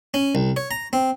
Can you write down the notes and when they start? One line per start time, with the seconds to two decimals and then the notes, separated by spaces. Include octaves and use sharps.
0.14 C#4
0.35 C2
0.57 C#5
0.71 A#5
0.93 C4